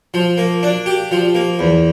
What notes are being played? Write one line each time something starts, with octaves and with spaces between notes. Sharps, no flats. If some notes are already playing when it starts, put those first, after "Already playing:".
F3
A#3
D4
G4
F3
A#3
E2